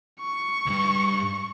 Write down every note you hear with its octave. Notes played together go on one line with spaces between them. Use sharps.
C#6
C#2 G2